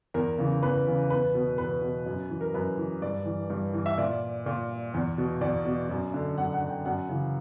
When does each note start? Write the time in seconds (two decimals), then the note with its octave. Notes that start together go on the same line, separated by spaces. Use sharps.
0.14 E2 A#4
0.38 C#3 E3
0.62 E2 B4
0.86 C#3 E3
1.10 E2 B4
1.35 B2
1.58 E2 B4
1.82 B2
2.06 F#2
2.30 E3
2.41 A#4
2.54 F#2 B4
2.78 E3
3.02 G2 D5
3.26 E3
3.50 G2
3.74 E3
3.86 E5
3.98 A#2 D5
4.46 A#2
4.94 E2
5.18 B2
5.41 E2 D5
5.65 B2
5.89 F#2
6.14 D3
6.37 F#2 F#5
6.53 F#5
6.62 D3
6.69 G5
6.85 F#2 F#5
7.09 C#3 E3